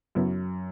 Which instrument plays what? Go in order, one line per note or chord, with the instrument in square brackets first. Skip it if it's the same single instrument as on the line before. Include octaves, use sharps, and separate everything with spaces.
[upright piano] F#2 [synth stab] C#3 F#3 B3 E4